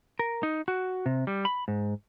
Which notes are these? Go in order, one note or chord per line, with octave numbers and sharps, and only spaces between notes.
A#4
D#4
F#4
C3
G3
B5
G#2